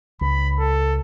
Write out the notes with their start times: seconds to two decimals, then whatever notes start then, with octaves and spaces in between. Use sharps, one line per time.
0.21 C#2 B5
0.59 A4